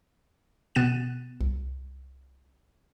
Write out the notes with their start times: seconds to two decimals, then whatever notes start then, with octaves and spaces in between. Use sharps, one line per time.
0.75 B2 B3 F#6 A6 D#7 E7
1.41 C2